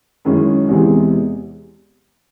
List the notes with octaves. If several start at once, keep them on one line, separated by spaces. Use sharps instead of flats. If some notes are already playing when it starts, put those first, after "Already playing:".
F#2 D#3 G#3 C#4 E4
E2 C3 E3 G#3